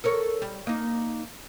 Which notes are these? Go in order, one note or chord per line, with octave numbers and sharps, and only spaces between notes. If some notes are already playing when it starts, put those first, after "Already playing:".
A4 A#4 C#5
G3
A#3 D#4